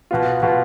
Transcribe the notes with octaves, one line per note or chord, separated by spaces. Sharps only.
B2 B3 F4
B2 B3 F4